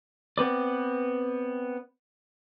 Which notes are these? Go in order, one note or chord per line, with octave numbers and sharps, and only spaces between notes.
B3 C4 B4 D5